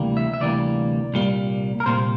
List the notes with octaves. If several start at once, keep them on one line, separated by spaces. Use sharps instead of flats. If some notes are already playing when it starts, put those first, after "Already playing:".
Already playing: D2 C3 E3 G3 A#3
E5
E5
D2 C3 E3 G3 A#3 D5
C2 A#2 G3 A#3
A#4
C2 A#2 G3 A#3 C5